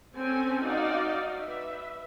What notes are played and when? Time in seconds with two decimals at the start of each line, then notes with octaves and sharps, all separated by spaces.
0.16 C4 C#4 A4 G#5
0.63 D#4 F#4 D5 D#5 F5
1.38 B4 E5